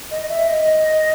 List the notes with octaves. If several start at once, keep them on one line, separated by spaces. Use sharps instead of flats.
D#5
D#5
E5
D#5